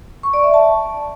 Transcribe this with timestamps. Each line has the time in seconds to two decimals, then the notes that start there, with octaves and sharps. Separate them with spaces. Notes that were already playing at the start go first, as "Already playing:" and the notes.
0.23 C#6
0.34 D5
0.44 E5
0.54 A5